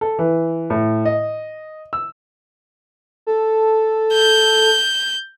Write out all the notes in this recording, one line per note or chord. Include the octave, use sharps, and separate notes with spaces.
A4
E3
A2
D#5
E6
A4
G6